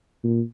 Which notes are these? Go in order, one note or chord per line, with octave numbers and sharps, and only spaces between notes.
A#2